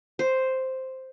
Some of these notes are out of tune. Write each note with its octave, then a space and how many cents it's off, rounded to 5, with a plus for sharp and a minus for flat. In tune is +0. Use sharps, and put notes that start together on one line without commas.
C5 +0